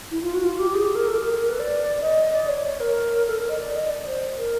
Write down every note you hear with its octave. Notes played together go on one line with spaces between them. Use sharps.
E4
F4
F#4
F4
G4
G#4
A#4
A4
A#4
A#4
B4
D5
D#5
D5
C#5
C#5
A#4
A4
A#4
D#5
D5
D#5
D5
C5
A#4